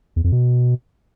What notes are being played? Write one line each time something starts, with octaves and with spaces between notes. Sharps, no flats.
E2
F2
B2